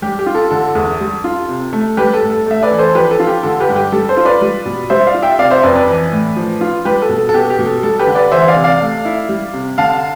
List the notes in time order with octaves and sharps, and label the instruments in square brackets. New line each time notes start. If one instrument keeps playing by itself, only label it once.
[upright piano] G3 G4
G4
F4
A4
D3 A4
E2
G3
F4
C3
A3
G3 G4 B4
A4
A2
A4
A3 E5
B4 D5
E3
A4 C5
F3 G4 B4
A4
F4
G4
D3 A4
G4 B4
G2
G4
G3 A4
A4 C5
F4
B4 D5
G3
B2
G3 C5 E5
D5 F5
F4
E5 G5
C3 D5 F5
C5 E5
F2 B4 D5
B4 D5
E3
A2
F3
F4
G3 G4 B4
A4
B2
A4
A4
B3 G4
G4
B2
A4
G3 A4
G4 B4
D3
B4 D5
E3 C5 E5
D5 F5
C3
D5 F5
A3
E4
G3
C3
D3 F5 A5